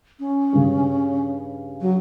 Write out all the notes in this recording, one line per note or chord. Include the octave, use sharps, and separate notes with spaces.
C#4
G2 C#3
F#3